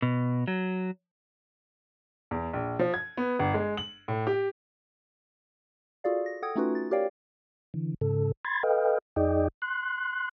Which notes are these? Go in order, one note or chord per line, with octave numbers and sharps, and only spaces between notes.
B2
F#3
E2
A#1
F3
G#6
B3
G1
G#3
F#7
A2
G4
F4 F#4 G#4 A4 D5 F5
A#6
A4 F#5 G5 D#6 G#6
A3 C#4 D#4 F4 F#4 B4
A6
G4 A#4 C#5 D5 F5 G5
D3 E3
G#2 C#3 A4
B5 C6 G#6 A6
A4 B4 D#5 F5 G5
F2 D#4 G#4 D5 D#5 G5
C6 F#6